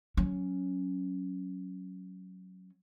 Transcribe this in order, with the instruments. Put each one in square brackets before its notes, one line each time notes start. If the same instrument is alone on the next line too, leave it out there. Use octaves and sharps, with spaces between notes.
[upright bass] F#3 C#4